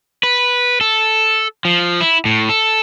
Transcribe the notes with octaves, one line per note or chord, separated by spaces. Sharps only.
B4
A4
F3
E4
A2
A4